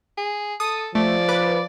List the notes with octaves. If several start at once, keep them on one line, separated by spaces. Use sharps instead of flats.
G#4
A4 D#6
F3 A3 D5
B4 D6